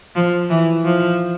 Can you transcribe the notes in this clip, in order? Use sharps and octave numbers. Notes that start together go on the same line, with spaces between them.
F3
E3
F3